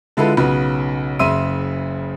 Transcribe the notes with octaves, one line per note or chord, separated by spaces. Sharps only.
D3 G#3 E4 F4 A4 B4
B1 C#3 F#4 B4
F#1 C#3 E5 C6 E6 D#7